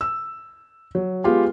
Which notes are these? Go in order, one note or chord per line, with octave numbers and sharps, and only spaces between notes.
E6
F#3
G#3 B3 F4 G4